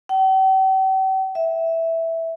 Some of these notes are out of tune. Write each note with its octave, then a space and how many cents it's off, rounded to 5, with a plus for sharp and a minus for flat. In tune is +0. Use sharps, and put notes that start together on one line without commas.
G5 -45
E5 -5